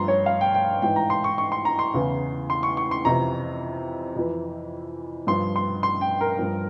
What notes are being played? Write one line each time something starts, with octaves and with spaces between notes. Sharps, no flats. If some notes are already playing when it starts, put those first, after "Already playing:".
Already playing: G2 F3 A#5 C6
C#5
F5
G5
G5
G#2 E3 G5
A#5
C6
C#6
C#6
C6
A#5
C6
E2 C#3 E3
C6
C#6
C#6
C6
F2 C3 E3 A#5
F2 E3
G2 F3 C6
C6
C6
G5
A#4
G2 F3